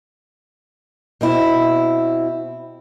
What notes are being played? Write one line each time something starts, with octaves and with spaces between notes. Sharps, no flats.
B2 C4 E4